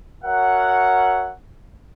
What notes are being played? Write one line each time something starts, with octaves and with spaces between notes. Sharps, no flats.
F#4 A#4 C#5 E5 F#5